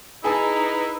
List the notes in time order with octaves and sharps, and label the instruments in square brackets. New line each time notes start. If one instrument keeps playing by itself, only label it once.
[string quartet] D#4 [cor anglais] E4 [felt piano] G#4 G#5 A5 [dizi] B4